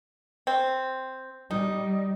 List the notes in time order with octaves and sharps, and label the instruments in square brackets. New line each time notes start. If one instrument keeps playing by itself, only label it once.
[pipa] C4
[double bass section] G3 [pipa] D#4